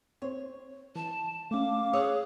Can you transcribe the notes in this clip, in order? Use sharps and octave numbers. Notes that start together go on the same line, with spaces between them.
C4 C5 C#5
E3 A5
A3 C#4 F5 D6
G#4 C#5 D#6 E6 F#6